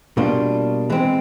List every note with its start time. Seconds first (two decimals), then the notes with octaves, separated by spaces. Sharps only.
0.17 B2 G3 A#3 D4 F4
0.90 E3 G#3 C4